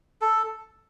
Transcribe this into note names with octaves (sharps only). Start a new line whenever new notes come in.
A4